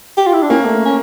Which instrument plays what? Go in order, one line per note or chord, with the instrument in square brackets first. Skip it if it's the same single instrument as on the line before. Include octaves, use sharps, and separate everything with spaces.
[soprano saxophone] G4
F4
E4
D4
[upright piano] A#3 [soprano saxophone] C#4
[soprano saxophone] A3
C#4